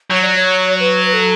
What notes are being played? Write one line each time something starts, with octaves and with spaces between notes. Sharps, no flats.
F#3 C#5
D5
C#5
B4
B4
A4